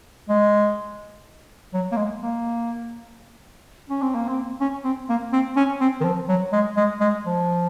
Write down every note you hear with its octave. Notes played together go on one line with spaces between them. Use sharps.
G#3
F#3
A#3
G#3
A#3
C#4
C4
A#3
C4
C#4
C4
A#3
C4
C#4
C4
D#3
F3
F#3
G#3
G#3
G#3
F3